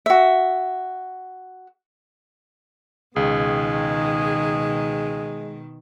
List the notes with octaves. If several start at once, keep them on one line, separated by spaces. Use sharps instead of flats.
F#4 E5
C#2 B2 D#3 G#3 G#4